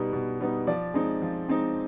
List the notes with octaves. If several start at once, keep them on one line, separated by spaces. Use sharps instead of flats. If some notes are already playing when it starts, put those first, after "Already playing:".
Already playing: B2 G3 B3 D#4
B2
G3 B3 D#4
F3 D5
G#3 C4 D#4
F3
G#3 C4 D#4